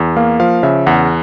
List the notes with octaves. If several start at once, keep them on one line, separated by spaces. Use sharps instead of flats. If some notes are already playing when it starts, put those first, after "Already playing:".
Already playing: E2
A#3 F5
F3 F5
C#3 E5
E2 F#5